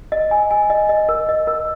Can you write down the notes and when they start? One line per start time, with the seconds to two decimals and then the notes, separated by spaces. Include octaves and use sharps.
0.12 D#5
0.31 G#5
0.51 G#5
0.70 D#5
0.89 D#5
1.09 A#4
1.29 D#5
1.47 A#4